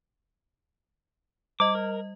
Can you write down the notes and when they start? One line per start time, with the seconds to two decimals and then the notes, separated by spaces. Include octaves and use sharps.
1.60 G3 D#5 D6
1.75 A#4